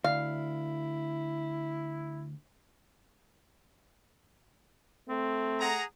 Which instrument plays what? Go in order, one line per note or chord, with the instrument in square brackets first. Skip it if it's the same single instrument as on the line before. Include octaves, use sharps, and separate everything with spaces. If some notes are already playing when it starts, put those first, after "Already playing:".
[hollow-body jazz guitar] D2 [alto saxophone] E4 [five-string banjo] F5
[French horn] A3 [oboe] C4
[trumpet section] G#4 F#5 A#5